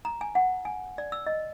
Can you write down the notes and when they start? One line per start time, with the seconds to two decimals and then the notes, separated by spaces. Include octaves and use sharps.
0.05 A#5
0.21 G#5
0.35 F#5
0.65 G#5
0.98 D5
1.12 E6
1.26 D#5